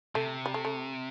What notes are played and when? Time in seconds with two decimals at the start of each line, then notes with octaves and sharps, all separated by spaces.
0.15 C3 A3
0.46 G3
0.54 A3
0.65 A3